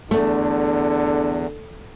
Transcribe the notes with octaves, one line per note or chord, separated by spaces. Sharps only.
E2 D3 A3